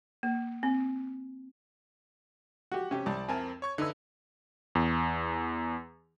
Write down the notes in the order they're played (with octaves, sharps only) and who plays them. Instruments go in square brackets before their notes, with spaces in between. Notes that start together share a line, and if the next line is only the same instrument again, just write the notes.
[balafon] A#3
C4
[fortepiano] F#4 G4 [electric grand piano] F#5
[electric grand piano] C3 [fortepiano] C#4 G4
[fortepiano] C2 [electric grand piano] D5 A5
[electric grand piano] F2 C4 A#4 [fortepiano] G#5 A5
[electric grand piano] C#5 C#6 G#6
[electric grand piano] D3 B4 [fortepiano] D#4 E6
[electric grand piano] E2